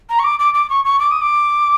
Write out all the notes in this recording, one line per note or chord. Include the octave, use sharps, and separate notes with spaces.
A#5
C#6
D6
D6
D6
C#6
C#6
D6
D#6
D6